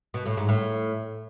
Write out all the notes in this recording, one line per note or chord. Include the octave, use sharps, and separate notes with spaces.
B2
A2
G#2
A2